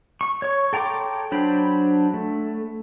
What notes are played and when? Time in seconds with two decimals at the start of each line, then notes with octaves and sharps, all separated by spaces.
0.21 C#6
0.42 C#5 C#6
0.73 A4 G5 A#5 C6 D6
1.32 F#3 D4 C5 B5
2.14 A3